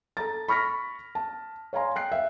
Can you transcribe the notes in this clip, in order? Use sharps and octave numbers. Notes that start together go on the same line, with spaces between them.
A4 A#5 A6
B5 C#6 F6 A#6 B6
A5
C#5 F5 G#5 A#5 C6
G5 F#6 C7
E5 F5